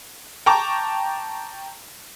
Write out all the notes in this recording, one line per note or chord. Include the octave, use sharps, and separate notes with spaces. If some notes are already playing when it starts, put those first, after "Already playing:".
G5 A5 A#5 C#6 D6